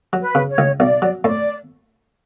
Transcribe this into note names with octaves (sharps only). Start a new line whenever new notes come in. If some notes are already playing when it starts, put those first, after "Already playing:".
F#3
B4
C#3
C#5
C#2
B1 D5
F#3
A2 D5